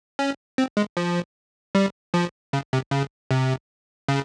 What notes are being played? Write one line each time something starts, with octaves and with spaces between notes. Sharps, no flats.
C#4
C4
G#3
F3
G3
F3
C#3
C3
C#3
C3
C#3